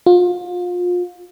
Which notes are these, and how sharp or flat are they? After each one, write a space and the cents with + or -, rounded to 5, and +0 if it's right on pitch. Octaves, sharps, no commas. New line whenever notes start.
F4 +30